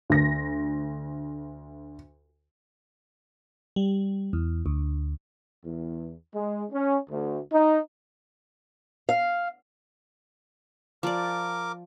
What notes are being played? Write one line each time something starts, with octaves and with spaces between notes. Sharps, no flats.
D2 A#6
G3
E2
D2
E2
G#3
C#4
D2
D#4
F5
F3 A#4 D5 D6